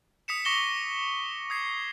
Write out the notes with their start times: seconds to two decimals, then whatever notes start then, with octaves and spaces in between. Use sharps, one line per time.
0.28 D#6 B6 C#7 E7
0.45 C#6 D6 A#6 C#7 E7 G7
1.50 D#6 G#6 C7